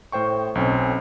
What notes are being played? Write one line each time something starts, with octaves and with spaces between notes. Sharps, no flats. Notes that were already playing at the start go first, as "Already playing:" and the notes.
A2 C5 G5 C#6
B1 C4 C#4